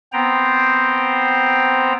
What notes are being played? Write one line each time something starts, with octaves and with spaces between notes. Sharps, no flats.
B3 C4 C5 G5 A#5